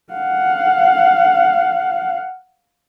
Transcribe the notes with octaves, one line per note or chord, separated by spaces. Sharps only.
F5 F#5